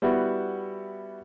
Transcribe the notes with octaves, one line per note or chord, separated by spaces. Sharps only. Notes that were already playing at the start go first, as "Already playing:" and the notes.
G3 B3 E4 F#4